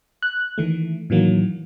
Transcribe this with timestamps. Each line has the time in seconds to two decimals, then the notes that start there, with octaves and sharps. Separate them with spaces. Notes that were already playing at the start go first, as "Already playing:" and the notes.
0.22 F#6
0.58 D#3 E3 A3
1.10 A2 D#3 E3 F#3 A#3